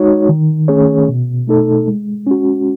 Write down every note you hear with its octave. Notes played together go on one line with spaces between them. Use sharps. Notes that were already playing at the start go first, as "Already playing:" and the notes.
Already playing: G#3 D#4 F#4 C#5
D#3
A3 C#4 G#4 C#5
B2
A3 D#4 A4
G#3
C#4 F#4